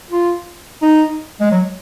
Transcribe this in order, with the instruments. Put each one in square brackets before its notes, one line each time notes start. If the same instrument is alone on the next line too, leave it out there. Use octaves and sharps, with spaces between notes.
[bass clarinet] F4
D#4
G#3
F#3